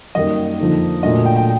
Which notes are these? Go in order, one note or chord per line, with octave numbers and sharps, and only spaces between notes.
F#2 D#3 G3 A#3 D#5
F2 D3 F3 A#3 D#4
A#2 F#3 A3 D4 D#5
G5
G5